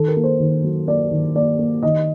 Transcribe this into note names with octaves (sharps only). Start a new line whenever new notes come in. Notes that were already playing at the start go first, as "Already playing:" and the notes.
Already playing: D#3 A4
A#4
A#3
C5
D#3
F#3
A#3 D5
D#3
A#3 D5
A#3
D#3 D#5